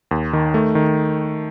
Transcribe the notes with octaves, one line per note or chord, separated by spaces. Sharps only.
D#2
D#3
A3
D#3